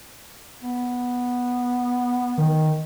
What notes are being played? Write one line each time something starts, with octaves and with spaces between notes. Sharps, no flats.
B3
D#3